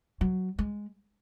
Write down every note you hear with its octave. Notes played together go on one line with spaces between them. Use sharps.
F#3
G#3